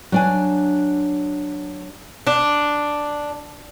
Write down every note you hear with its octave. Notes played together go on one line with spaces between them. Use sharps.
F#3 D4 G#5
D4